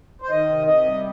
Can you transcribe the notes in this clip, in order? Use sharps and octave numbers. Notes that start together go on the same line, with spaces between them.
C5
D#3 D#5
C3
C3 D#5
G3